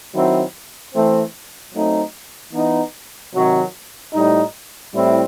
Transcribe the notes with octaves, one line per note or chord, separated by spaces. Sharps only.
D#3 F#3 C4 E4
E3 A3 C4
F#3 A3 C4 D#4
E3 B3 D#4
C3 D#3 F#3
A2 G3 D#4
A2 G3 C4 E4